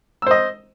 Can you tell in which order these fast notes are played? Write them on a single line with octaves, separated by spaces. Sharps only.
E6 C5 D#5